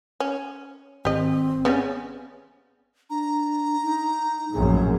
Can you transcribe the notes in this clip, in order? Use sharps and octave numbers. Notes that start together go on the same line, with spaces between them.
C#4
G#1 C4 G4 D#5
C#3 G3 B3 C#4
D4 A#5
D#4
A#1 F#2 A2 G#4